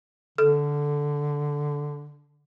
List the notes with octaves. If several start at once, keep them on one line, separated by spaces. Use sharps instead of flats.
D3 A4